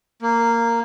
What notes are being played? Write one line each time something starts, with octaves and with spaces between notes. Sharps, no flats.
A#3